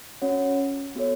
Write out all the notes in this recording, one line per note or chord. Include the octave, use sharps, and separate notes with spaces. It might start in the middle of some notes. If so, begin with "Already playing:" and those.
C#4 F#4 C#5 F#5
B3 F#4 A4 C#5